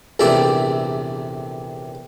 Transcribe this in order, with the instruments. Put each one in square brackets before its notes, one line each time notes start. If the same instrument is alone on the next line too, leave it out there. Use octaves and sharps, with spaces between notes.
[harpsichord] A#1 E2 C3 A3 D5 E5